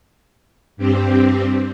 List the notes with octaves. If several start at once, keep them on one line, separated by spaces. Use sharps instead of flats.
G2 G3 C4